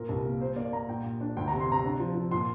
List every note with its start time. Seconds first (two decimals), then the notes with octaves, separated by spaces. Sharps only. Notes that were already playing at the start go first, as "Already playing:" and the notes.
Already playing: A#2 A#4
0.09 C2
0.25 A#3
0.40 A#3 C5
0.56 A#3 D5
0.73 A#3 A#5
0.88 A#2 G5
1.04 A#2
1.21 D4
1.37 D2 G5
1.48 A#5
1.52 C3
1.60 C6
1.68 C3 A#5
1.85 D4
2.00 F3
2.16 F3
2.31 A#2 C6